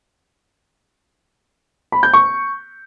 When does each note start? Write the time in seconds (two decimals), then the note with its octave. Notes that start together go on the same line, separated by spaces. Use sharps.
1.92 B5
2.03 G6
2.13 C#6